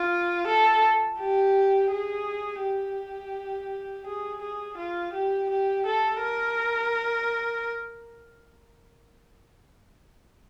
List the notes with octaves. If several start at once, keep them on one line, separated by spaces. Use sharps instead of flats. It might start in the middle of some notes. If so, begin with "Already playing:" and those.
Already playing: F4
A4
G4
G#4
G4
G#4
G#4
F4
G4
G4
A4
A#4